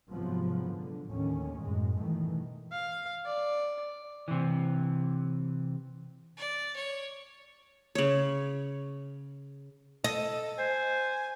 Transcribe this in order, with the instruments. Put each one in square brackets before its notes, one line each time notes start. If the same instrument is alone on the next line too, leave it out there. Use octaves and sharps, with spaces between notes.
[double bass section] G#2 C3 F3 F#3 B3
D3
D#2 A2 D3 D#3 C#4
F#2 A2 G#3
G2 B2 D#3 E3 A3
[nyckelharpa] F5
D5
[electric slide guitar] C3 E3
[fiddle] D5
C#5
[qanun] C#3 C#5
[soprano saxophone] A4 [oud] D#5
[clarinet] C5 [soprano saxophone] G#5